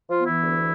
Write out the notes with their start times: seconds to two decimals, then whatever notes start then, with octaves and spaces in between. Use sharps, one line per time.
0.09 F3 F4
0.17 B3
0.25 E3 E4
0.41 D2